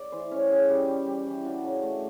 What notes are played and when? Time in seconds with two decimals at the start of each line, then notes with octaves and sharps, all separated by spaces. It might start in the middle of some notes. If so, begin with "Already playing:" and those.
Already playing: D5
0.12 E3 C5
0.31 C#4 C#5
0.51 C#4 G#4
0.69 G3 G4
0.88 G3
1.06 G3
1.26 E3
1.45 D4 F#4
1.64 C#3
1.83 A3